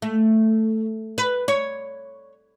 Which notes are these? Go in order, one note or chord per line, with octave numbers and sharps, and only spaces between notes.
A3
B4
C#5